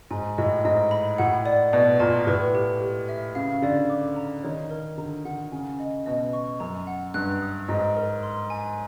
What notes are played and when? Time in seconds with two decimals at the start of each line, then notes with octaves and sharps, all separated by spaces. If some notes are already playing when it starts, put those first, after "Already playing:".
0.11 G#2 G#5
0.38 A2 D#5
0.65 G#2 D#5
0.91 B5
1.18 A2 F#5
1.46 D5
1.73 B2 D5
2.00 A#2 A5
2.27 A2 B4
2.55 G4
2.81 G4
3.09 E5
3.35 C#3 F5
3.62 D3 D5
3.90 D6
4.16 A#5
4.43 D#3 C#5
4.71 A#4
4.98 D3 A#5
5.25 D3 F#5
5.52 C#3 G#5
5.80 D#5
6.06 B2 D#5
6.33 C#6
6.60 F#2 A#5
6.87 F#5
7.14 G2 F#6
7.42 D#6
7.69 G#2 D#5
7.97 A#4
8.23 C6
8.50 G#5